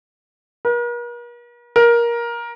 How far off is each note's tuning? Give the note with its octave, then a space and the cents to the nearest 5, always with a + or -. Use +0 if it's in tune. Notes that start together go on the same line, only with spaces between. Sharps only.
A#4 +45
A#4 +15